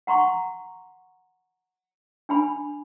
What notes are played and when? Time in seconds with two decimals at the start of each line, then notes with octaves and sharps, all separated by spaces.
0.07 F#5 A#5 C6 C#6
2.29 D4 G#5 B5